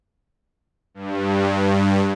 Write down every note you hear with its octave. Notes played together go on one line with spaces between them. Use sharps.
G2